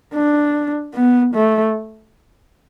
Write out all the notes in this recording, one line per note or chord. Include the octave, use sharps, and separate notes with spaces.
D4
B3
A3